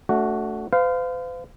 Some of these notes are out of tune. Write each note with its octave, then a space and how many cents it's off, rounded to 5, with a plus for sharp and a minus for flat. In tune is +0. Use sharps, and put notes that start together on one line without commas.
A3 +0 D4 -40 F#4 +0
C5 -45 F5 +0